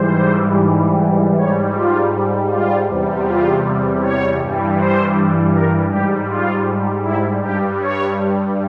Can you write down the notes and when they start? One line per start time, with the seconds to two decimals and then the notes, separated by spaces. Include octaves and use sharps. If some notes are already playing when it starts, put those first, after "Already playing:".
Already playing: G#2 E3 G3 C5
1.37 G#2 G3 C#5
1.75 F4
2.51 F4
2.88 E2 C3 G3
3.26 F4
4.02 C#5
4.40 G2 E3 G3
4.78 C5
5.53 A#4
5.91 G#2 G3 G4
6.29 F4
7.04 E4
7.42 G2 G3 G4
7.80 C#5